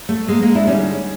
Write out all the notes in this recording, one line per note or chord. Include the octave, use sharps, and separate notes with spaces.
A3
G#3 A#3
G#3 A#3
D4 E4
D3 G3 C#4 D#4